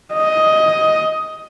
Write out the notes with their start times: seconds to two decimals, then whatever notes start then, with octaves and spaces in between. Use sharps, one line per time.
0.14 D#5